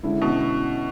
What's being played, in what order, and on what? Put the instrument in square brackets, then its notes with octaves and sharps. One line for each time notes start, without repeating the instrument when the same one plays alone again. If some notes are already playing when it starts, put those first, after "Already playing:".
[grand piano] D3 G#3 C#4 E4
[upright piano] B2